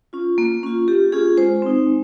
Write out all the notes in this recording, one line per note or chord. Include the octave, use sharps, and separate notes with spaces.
C#4 F4
A#3
C#4 F4
A#3 G4
C#4 F4 G#4
G#3 C5
C4 D#4
G#3